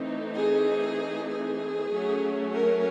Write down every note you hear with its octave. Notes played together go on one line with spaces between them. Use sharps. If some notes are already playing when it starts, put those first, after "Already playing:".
Already playing: E3 A3 C4 D#4
G#4
G#4
F#3 A3 C#4
A#4